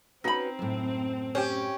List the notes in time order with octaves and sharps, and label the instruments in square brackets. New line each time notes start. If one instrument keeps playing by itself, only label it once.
[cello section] C4 [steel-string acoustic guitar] C#4 F#4 B4 [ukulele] D#4 B5
[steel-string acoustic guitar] F#2 A2
[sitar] C#4 G4 [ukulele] C5